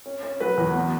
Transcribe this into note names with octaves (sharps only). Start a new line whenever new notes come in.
C#4
C#4
F#3 B4
E2
B3